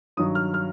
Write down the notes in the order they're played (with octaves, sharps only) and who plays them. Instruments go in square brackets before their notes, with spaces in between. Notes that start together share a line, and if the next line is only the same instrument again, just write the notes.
[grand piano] G2 D#3 F#3 D#6
F6
F6